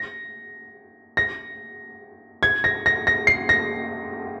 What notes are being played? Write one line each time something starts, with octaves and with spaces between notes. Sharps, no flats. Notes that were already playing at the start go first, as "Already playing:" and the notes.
Already playing: A#6
A#6
G#6
A#6
A#6
A#6
C7
A#6